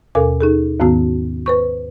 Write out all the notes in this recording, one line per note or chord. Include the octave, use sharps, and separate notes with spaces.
D#2 B2 A4 A#4 G#5 D6
D#4 G#4 A4
D#2 G#2 D#3 B3 F#4
B4 C5 C#6